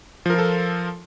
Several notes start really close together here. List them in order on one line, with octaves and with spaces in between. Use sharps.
F3 A#4 F4 A4